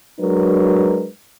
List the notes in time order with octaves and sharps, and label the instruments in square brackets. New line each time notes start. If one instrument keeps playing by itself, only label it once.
[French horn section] F#3 G#3 D4 A#4 B4